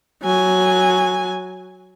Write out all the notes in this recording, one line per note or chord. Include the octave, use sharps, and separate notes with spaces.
F#3 G#5